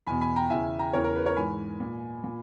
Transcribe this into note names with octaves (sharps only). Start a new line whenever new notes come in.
E2 B2 G#5 B5
G#5 B5
G5 A#5
E2 C#3 E3 E5 G#5
G5 A#5
E2 C#3 E3 A#4 C#5
A#4
B4
A#4 C#5
G#2 E3 G#5 B5
A#2
A#2